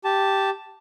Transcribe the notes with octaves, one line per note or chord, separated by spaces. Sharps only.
G4 A5